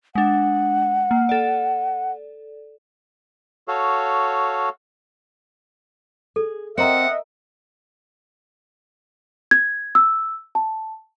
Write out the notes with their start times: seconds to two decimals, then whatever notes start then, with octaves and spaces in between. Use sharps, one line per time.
0.15 G#3 D4 F#5
1.11 A#3
1.29 A4 D5
3.68 F#4 A4 C#5 F5
6.36 G#4 A4
6.78 C4 A#4 D#5 E5 F#5 G5 A#5
9.51 G#6
9.95 E6
10.55 A5